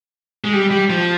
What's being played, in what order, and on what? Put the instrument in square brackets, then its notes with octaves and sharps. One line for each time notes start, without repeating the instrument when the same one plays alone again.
[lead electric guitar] G#3
G3
G3
F3